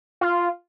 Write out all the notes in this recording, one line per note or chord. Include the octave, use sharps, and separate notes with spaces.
F4